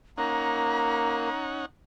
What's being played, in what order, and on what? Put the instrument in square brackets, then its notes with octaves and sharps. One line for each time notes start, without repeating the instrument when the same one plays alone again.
[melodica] A#3 [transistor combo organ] C#4 D#4 F#5 [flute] A#5